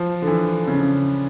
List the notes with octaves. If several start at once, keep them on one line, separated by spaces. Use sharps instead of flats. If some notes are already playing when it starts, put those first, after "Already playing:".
Already playing: F3
D3
E3
C#3